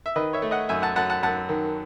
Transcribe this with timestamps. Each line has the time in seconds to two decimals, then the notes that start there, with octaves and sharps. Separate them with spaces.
0.06 E5
0.16 D#3 B4 D#5
0.33 C#5 E5
0.42 A3
0.51 D#5 F#5
0.69 F#2 E5 G#5
0.82 F#5 A5
0.96 F#2 F#5 A5
1.10 F#5 A5
1.23 F#2 F#5 A5
1.49 D#3